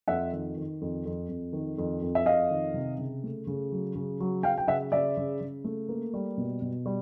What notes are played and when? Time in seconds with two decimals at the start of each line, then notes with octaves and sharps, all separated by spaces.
0.08 F2 E5 F#5
0.33 D#3
0.57 D#3
0.81 F2
1.06 F2
1.29 F2
1.53 D#3
1.78 F2
2.02 F2
2.15 E5
2.25 F2 D#5 F5
2.50 D#3
2.74 C3
2.98 C#3
3.23 A3
3.47 C#3
3.72 F#3
3.95 C#3
4.20 F#3
4.43 F#3 F5 G5
4.58 G5
4.68 C#3 E5 F#5
4.92 C#3 D5 E5
5.17 C#3
5.41 C#3
5.64 A3
5.89 A#3
6.14 G3
6.38 B2
6.62 B2
6.86 G3